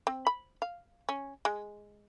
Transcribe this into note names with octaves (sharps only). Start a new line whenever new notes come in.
C4
B5
F5
C#4
G#3